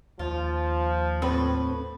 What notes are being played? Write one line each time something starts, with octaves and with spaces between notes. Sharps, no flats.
D#2 F3 F4
A2 C4 B4